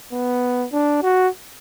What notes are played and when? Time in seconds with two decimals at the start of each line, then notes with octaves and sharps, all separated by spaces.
0.13 B3
0.72 D4
1.02 F#4